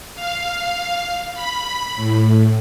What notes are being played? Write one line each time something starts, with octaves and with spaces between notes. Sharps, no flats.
F5
B5
A2